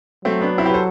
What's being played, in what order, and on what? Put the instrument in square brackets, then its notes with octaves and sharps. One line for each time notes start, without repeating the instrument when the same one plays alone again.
[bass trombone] F#3 [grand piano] A3 C4
[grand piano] B3 D4
C4 E4
G4 B4
A4 C5